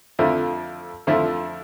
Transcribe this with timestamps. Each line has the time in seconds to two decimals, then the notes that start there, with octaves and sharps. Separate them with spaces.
0.19 F2 D3 F3 A3 E4
1.07 F2 D3 F3 A3 E4